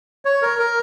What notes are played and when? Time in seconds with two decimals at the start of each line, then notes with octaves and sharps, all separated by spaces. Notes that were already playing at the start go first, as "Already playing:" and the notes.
0.25 C#5
0.42 A#4
0.59 A#4